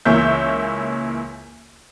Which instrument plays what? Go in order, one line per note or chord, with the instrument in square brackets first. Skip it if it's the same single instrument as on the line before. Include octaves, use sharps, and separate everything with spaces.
[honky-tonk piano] C#2 E3 A#3 C#5 E5 G6